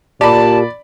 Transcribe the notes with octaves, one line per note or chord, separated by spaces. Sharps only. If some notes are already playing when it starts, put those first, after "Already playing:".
A#2 G4 D5 A5 B5